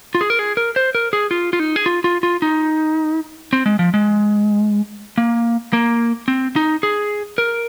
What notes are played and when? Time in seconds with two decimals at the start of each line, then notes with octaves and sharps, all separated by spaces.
0.15 F4
0.21 G#4
0.30 A#4
0.39 G#4
0.57 A#4
0.76 C5
0.95 A#4
1.13 G#4
1.31 F4
1.53 F4
1.59 D#4
1.76 G#4
1.86 F4
2.04 F4
2.23 F4
2.42 D#4
3.53 C4
3.66 G#3
3.79 F3
3.94 G#3
5.18 A#3
5.73 A#3
6.28 C4
6.56 D#4
6.83 G#4
7.38 A#4